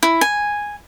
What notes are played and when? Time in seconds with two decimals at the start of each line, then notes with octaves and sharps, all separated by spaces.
0.03 E4
0.21 G#5